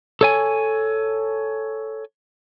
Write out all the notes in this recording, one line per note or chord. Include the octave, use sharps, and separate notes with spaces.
A4 C#5 G#5